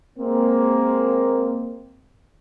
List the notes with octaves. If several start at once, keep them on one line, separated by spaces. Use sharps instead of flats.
G#3 A#3 C4